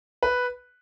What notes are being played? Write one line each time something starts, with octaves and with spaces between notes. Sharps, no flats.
B4